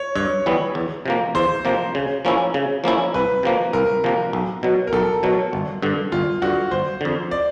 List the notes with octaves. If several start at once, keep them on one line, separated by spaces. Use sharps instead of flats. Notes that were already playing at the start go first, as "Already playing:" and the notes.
Already playing: C#5
G2 C#5
E3 G3 B3 E4
E2
C3 F3 A#3
E2 C5
C3 F3 A#3
C#3
F3 A#3 C#4 E4
C#3
F3 A#3 C#4 E4
C2 B4
C3 F3 A#3
C2 A#4
C3 F3 A#3
B1
B2 F#3
A#4
B1 A4
B2 F#3
G1
G2 D3
G1 F4
G2 D3 F#4
G1 C5
F2 D3
D5